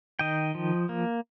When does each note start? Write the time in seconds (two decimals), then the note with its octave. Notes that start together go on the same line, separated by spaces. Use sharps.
0.19 D#3 D#5 G5
0.55 F3
0.89 A#3